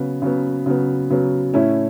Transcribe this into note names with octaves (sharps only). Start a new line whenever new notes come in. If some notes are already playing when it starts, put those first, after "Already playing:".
Already playing: C#3 F#3 B3
C#3 F#3 B3
C#3 F#3 B3
C#3 F#3 B3
A2 A3 C#4 E4